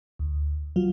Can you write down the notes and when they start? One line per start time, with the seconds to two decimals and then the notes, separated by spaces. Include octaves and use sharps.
0.19 D2
0.76 F#3 F4